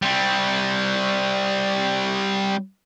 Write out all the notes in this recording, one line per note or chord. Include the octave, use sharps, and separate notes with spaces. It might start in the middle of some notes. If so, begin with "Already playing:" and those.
G3 C4